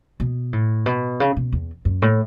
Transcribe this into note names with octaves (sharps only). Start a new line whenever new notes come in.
B2
A2
B2
C#3
B2
E2
F#2
A2